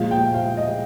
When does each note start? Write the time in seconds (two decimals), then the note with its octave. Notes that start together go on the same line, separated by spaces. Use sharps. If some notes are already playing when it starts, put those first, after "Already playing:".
Already playing: A#2 F3 G#3 F5
0.11 G5
0.34 F5
0.57 D#5